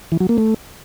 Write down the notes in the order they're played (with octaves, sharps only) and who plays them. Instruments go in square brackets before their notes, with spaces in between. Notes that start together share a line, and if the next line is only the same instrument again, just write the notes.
[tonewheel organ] E3
F#3
A#3
A3